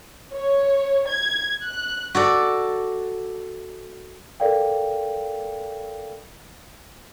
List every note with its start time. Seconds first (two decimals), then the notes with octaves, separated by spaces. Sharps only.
0.33 C#5
1.07 G#6
1.63 F#6
2.15 F#4 A4 D5
4.40 A4 A#4 D5 F5 G5